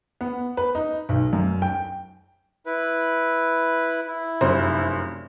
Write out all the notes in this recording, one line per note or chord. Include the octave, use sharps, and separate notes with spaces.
B3
B4
D#4
B1
F#2
G5
E4 B4
E4
F1 F#2 C5